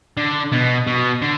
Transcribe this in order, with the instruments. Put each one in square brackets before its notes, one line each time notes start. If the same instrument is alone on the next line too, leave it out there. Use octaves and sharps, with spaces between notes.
[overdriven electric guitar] D3
B2
B2
D3